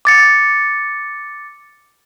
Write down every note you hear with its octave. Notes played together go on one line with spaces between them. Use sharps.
D6 A6 C#7